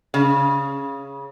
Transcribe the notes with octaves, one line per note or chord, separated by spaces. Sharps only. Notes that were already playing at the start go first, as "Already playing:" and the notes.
C#3